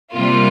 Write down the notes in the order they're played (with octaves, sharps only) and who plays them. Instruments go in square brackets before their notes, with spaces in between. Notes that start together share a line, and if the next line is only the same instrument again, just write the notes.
[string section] C3 G3 A#3 F4